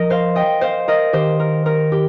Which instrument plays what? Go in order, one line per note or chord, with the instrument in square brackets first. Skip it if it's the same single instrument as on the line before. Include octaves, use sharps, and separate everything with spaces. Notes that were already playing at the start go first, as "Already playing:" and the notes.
Already playing: [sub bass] F3 [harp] A#4 D#5
[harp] C5 F5
D#5 G5
C5 F5
A#4 D#5
[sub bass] D#3 [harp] G4 C5
[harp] A#4
A#4
G4